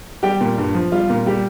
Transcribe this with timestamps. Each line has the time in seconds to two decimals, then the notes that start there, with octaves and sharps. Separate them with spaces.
0.23 G3 G4 G5
0.41 A#2
0.58 G2
0.75 F3
0.92 G3 F4 F5
1.10 A#2
1.26 G3 G4